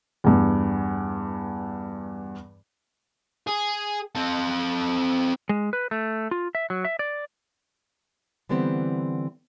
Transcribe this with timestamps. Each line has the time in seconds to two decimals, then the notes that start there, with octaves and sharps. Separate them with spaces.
0.24 E2 G2
3.47 G#4
4.15 C4 A4
5.49 G#3
5.73 B4
5.91 A3
6.31 F4
6.55 E5
6.70 F#3
6.85 E5
6.99 D5
8.49 D3 E3 G3 B3 C4